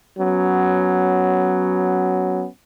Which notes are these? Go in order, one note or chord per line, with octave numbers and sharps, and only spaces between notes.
F#3 B3 C#4